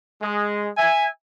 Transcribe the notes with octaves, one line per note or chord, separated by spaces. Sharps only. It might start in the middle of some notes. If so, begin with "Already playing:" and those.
G#3
E5 G#5